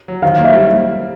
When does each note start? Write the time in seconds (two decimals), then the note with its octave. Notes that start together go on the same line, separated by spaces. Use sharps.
0.08 F#3
0.22 D#3 F5
0.38 A#3
0.44 E5
0.52 G3